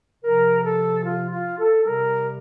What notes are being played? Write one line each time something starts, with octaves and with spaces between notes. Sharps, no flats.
C3 F3 A#4
A4
F4
F4
A4
C3 G3 A#4